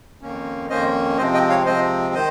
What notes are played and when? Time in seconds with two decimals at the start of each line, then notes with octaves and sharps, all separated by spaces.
0.22 F2 D#3 A#3 C#4
0.70 F2 D#3 A#3 C#4 C5 D#5
1.17 C3 F3 G#3 C4 C5 D#5
1.34 D#5 G5
1.49 C#5 F5
1.66 C3 F3 G#3 C4 C5 D#5
2.14 D#3 C5 D#5